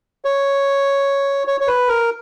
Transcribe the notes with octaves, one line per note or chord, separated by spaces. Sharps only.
C#5
C#5
C#5
B4
A#4